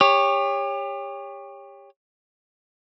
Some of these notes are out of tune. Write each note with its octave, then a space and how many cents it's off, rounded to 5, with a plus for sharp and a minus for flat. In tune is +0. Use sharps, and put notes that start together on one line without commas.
G4 +35 C#5 +0